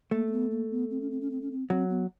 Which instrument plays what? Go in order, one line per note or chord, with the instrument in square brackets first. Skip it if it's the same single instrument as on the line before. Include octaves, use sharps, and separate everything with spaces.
[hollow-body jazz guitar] A3 [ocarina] A#3
[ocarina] A#3
B3
A#3
B3
C4
C#4
C4
C#4
C4
C#4
C4
[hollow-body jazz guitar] F#3 [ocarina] C4
[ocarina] B3